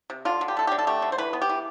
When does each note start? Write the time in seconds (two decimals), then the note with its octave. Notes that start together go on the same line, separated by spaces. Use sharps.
0.10 C3
0.25 D3 F4
0.41 D3
0.48 G4
0.57 A3 A4
0.67 D3 G4
0.78 A4
0.87 A3 G4
1.02 D3
1.12 C5
1.18 E3 B4
1.33 B3
1.41 G4
1.49 E3